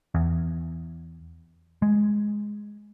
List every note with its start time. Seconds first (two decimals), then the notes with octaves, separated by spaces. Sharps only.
0.15 E2
1.82 G#3